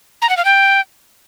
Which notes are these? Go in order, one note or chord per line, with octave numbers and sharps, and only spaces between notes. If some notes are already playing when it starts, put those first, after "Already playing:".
A#5
F#5
F5
G5